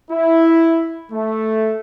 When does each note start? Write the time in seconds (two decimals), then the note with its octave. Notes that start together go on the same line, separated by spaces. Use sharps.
0.11 E4
1.12 A3